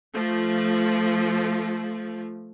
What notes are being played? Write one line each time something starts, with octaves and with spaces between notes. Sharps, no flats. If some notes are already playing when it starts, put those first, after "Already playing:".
F3 A3